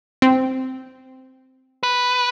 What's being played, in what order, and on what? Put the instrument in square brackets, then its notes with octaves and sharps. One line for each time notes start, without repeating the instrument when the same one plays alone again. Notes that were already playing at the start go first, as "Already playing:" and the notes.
[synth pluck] C4
[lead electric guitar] B4